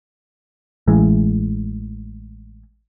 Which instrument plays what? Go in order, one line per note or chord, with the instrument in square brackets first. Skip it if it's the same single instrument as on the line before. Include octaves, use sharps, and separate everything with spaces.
[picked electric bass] A1 E3 G#3